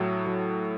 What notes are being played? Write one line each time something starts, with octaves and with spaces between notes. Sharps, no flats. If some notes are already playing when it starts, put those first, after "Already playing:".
Already playing: A2 F#3 A4
F#3